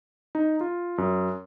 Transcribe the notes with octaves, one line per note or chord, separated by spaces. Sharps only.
D#4
F4
F#2